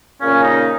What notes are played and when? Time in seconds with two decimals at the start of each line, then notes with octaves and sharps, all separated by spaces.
0.20 A#2 C#3 C#4
0.43 D#4